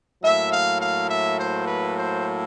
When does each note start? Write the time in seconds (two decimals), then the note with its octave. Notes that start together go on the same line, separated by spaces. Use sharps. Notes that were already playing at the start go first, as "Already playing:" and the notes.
0.22 A2 F#3 A#3 E5
0.51 F5
0.80 F5
1.10 E5
1.39 C5
1.67 B4
1.96 C5